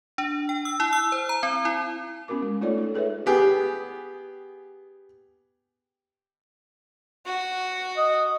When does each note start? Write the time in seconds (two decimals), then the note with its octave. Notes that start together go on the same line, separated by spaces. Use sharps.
0.18 D4
0.49 G5
0.65 E6
0.80 E4
0.93 E6
1.12 C5
1.29 A#5
1.43 C4
1.65 E4
2.28 B3 C#4 F#4 A#4 D6
2.42 G#3
2.61 A3 D#4 F4 A4 C#5 D5
2.78 D#4 A4
2.94 G#4 A4 B4 C#5 E5
3.26 B3 G4 G#4
7.26 F#4
7.97 D#5